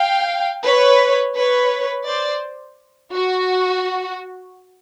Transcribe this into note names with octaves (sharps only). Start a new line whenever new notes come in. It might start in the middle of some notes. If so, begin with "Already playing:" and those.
Already playing: F5 G5
B4 C#5
B4 C#5
C5 D5
F#4